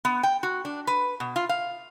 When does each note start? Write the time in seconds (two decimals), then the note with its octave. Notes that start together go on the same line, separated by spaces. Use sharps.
0.05 B3
0.23 G5
0.43 F#4
0.65 D4
0.87 B4
1.20 B2
1.36 F4
1.49 F5